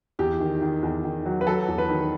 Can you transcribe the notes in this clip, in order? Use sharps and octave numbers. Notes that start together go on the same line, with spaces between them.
E2 G4
D#3
D#3
E2
D#3
F#3
B4
F#3 A4
E2
B4
D#3